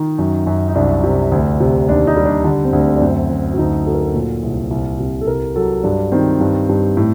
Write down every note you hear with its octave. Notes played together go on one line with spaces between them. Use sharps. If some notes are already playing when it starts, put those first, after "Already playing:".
Already playing: D#3 D#4
F#2
F#2
D#4
C2 D4
C3
D2
C3
D#2 D4
D#4
G3
D4
D3
C4
D2 D4
D4
F#2 C4
F#2
F#4
D2 D#4
F#3 A4
A#4
A4
A#2
C2
C2
C3
A4
C2 A#4
F#3 A4
G2 D4
D#3 C4
G2
G2
A2